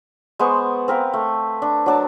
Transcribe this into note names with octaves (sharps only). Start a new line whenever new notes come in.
G#3 B3 C5 C#6
C4 A#4 B4 F5
A3
D4
F#3 D4 A5